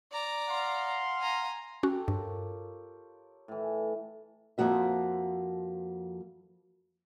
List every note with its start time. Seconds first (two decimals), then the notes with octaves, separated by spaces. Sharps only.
0.12 D5 A#5
0.49 F5 F#5 C6
1.21 G#5 A#5
1.83 C#4 F#4 G4 A4
2.08 G2 F4 A#4 C#5
3.48 A2 E3
4.58 F2 F3 A#3 F#4 E5